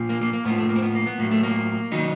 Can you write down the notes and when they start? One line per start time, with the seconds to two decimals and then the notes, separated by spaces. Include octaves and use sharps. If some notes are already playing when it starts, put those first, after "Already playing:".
Already playing: A#2 F3
0.09 A#3
0.21 A#3
0.33 A#3
0.45 A2 F3 B3
0.58 A3
0.69 A#3
0.75 C4
0.82 B3
0.95 A#3
1.06 B3
1.19 A2 F#3 A#3
1.31 A3
1.43 A#3
1.92 D#3 F#3 D#4